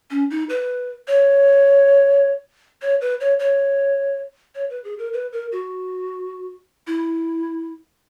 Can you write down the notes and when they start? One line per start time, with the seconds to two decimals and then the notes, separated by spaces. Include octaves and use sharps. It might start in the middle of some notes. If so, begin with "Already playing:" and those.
0.11 C#4
0.31 D#4
0.49 B4
1.08 C#5
2.82 C#5
3.01 B4
3.20 C#5
3.39 C#5
4.55 C#5
4.70 B4
4.84 G#4
4.99 A#4
5.13 B4
5.33 A#4
5.52 F#4
6.87 E4